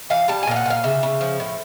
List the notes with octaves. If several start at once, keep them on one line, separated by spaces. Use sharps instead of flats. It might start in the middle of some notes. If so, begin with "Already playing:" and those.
E3 F5
G3 A5
G#5
A#2 F5
F#5
A#2 F5
C#3 E5
C#3
F3
A2